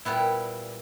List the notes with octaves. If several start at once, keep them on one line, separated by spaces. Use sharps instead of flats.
A#2 G3 B3 E4